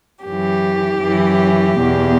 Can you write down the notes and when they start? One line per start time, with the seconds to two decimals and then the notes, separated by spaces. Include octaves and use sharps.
0.24 F#2 E3 G4
1.00 F#2 E3
1.77 E2 B2